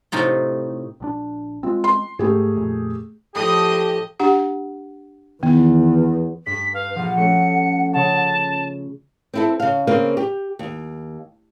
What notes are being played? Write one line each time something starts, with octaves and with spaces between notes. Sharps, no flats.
A2 C3 D#4 F4
A#1 F3 D4
G#3 A3 C4 F4
C6
G#2 A3 G4 G#4
F2 A#2
A2 F3 G4 B4 D#5 D#6
D4 G4 F#5
E2 D#3 B3
G2 B6
B4 F5
A#1 F3 F#5
A3 C#4 C#7
C#3 C#5 A5
C4 E4 A4
C#3 F5
C#3 A#3 C4 B4 F5
G4
D#2